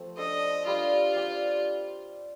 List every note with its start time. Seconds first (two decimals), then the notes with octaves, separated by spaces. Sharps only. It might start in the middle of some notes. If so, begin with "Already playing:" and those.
Already playing: F3 A3 C4
0.17 D4 A4 C5 D#5
0.67 G3 D4 F4 A4
1.16 C4 G4 D5